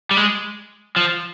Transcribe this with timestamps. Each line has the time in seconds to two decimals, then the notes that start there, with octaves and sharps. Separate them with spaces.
0.11 G3
0.17 G#3
0.96 F3